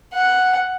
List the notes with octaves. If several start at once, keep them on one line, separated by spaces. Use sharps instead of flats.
F#5